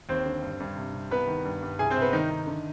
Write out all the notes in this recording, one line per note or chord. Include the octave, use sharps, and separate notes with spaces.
D#2 C4 C5
D3
G2
G2
C3
C3
C2 B3 B4
D#3
G2
G2
C2 G#4 G#5
C4 C5
C2
B3 B4
D#3 D#4
D#3
D3